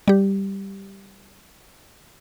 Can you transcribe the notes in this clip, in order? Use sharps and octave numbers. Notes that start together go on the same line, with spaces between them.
G3 G4